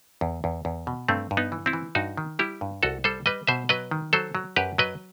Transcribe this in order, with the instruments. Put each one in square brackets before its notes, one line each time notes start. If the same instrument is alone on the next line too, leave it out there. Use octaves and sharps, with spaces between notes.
[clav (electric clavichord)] E2
E2
E2
B2
G2 A3 C4
G2
B3 D#4
E3
C4 E4
E3
G2 D#4 F#4
D#3
G3 E4 G4
G2
C2 F#4 A4
G3 A4 C5
G3 B4 D#5
B2 C5 E5
F#3 B4 D#5
D#3
F#3 A4 C5
F#3
F#2 G4 B4
F#3 B4 D#5